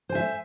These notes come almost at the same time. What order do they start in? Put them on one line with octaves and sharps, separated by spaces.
C5 G#5 E5